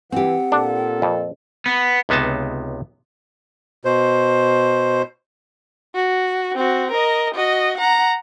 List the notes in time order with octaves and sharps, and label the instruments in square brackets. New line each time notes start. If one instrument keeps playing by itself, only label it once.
[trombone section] E3 [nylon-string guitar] C4 G4 [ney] F#5
[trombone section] A#2 F4 A4 [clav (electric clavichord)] D4
[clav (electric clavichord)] F2
[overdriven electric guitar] B3
[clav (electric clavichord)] C#2 C3 B3 D#4 A5
[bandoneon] B2 C5
[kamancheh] F#4
C4 F#4
A#4 D#5
F#4 D#5
F#5 A#5